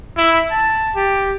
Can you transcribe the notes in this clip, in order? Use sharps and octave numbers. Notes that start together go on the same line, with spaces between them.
E4
A5
G4